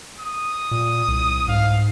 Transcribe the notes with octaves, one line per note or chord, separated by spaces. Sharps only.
D#6
A#2
C2
G#2 F5